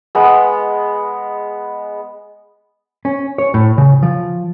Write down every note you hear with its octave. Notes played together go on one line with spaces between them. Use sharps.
G#3 B3
C#4
C#5
A2
C#3
F3